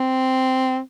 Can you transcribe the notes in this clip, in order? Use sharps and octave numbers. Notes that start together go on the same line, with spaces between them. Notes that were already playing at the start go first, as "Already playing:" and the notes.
Already playing: C4